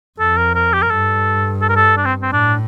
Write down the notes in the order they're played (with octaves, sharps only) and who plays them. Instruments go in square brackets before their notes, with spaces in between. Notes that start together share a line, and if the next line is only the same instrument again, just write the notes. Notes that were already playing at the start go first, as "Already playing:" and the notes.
[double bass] F2 [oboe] A4
[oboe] A#4
A#4
G4
A#4
[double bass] G2 [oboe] A4
[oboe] A4
A#4
A4
D4
C4
C4
[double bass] A2 [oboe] D4